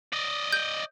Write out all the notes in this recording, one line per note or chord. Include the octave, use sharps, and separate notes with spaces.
D5 D#5
G6